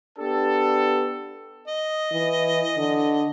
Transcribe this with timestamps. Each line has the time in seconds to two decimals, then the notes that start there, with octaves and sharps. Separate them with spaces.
0.19 B3 D4 G4 A4
1.68 D#5
2.12 E3
2.78 D3